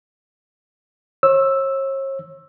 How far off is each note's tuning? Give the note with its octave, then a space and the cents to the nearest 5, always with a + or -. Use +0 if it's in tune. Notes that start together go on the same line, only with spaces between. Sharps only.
C#5 -40 E6 +0